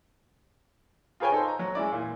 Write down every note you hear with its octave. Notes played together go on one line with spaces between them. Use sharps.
F4 G#4 B4 C#5 G5 G#5
D#4 A4 C5
A#5
F#3
G#3 C#4 E4 D5
A#2 E3